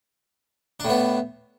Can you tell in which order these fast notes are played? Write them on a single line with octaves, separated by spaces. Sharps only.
D4 A2 B3